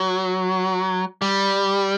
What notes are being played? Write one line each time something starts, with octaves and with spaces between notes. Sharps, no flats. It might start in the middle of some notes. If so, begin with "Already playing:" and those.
Already playing: F#3
G3